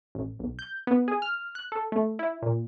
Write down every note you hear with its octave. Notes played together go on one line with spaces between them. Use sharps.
A1
B1
G6
B3
G#4
F6
F#6
A4
A3
E4
A#2